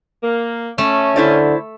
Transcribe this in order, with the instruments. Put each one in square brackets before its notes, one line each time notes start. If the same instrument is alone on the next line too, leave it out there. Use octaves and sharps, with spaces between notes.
[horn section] A#3
[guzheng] A3 [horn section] C#4
[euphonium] D3 [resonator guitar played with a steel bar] E4 C5 D5